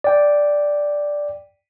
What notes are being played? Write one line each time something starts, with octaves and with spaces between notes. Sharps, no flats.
D5 G5